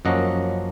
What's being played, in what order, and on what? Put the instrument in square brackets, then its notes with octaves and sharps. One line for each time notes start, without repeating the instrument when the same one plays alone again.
[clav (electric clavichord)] F#2 F3 A#3 C#4 D#5 F#5